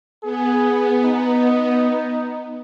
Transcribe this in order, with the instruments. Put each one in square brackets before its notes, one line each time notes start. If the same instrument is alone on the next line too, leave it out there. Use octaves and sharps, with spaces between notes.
[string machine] B3 [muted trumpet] G#4
[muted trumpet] D#4